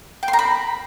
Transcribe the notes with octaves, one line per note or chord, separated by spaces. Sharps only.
G5
C6
A#5
B5